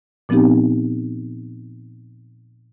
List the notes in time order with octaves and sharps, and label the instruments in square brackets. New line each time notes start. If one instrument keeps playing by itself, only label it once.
[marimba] A#2 F3 B3 C4 D#4 G4